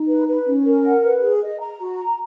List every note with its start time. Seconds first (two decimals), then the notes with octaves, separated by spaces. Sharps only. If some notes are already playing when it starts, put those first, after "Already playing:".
Already playing: D#4
0.08 B4
0.28 B4
0.46 C#4
0.65 A#4
0.84 F#5
1.03 B4
1.21 G#4
1.41 D#5
1.60 A#5
1.79 F#4
1.97 A#5